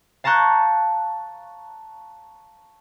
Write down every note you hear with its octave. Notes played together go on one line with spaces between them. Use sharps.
F5 A5 A#5 C#6 F#6 G6